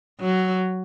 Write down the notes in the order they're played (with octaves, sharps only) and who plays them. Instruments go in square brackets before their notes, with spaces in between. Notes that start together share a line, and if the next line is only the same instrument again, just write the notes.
[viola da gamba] F#3